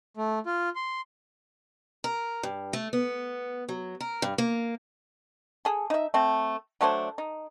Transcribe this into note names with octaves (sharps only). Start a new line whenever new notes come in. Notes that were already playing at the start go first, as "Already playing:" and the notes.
A3
F4
C6
A#4
G2
A3
B3
F#3
A#4
G2
A#3
G#4 A4
D#4 E5
A3 C4
F#3 A3 D4 C5
D#4